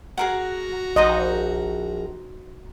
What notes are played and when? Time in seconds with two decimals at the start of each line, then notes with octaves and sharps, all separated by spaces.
0.17 F#4 G#4 A#4 F#5 A#5
0.96 A#1 D#4 C5 D#5 F#5